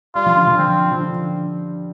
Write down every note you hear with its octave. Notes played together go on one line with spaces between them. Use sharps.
G3 F4
F3
D3
F3
C4
F3
D3